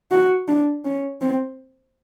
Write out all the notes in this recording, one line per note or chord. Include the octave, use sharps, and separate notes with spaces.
F#4
D4
C#4
C4